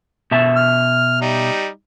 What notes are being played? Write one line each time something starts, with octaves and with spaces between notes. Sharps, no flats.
B2 E5 A5
F6
G3 D#4